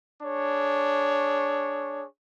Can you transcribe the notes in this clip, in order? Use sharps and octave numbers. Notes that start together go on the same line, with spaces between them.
D4 G#4 C#5